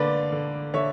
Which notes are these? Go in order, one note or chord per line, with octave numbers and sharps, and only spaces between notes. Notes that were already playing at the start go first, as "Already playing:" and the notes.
Already playing: D3 A#3 B4 D5
D3
D3 C#5 E5